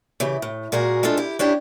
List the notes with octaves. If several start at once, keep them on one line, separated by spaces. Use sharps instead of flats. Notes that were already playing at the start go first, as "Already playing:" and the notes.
C#3 E3 G4
A2
A#2 G#3 F#4 G#4 A#4
G#3 A3 D4 F4 A4
E4 G4
C#4 D4 E4 G4